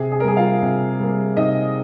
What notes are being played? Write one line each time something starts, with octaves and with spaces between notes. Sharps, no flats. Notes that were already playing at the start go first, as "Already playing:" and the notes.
Already playing: C3 G#4
G#4
A#4
G3 A#3 G#4
F4 F5
C3
G3 A#3
C3 D#4 D#5